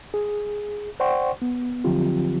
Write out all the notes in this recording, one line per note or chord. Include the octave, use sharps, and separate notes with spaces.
G#4
C5 D5 F#5 G5 C6 C#6
B3
D3 F3 F#3 C4 F4 G4